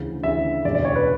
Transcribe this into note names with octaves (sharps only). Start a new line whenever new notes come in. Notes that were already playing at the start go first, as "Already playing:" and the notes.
Already playing: D2 C#3 E3
D2 C#3 E3 E5
E1 D2 C#3 D5
D5
C#5
B4